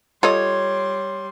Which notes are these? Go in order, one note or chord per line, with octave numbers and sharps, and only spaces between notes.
G3 F4 A4 C#5 D#5 C6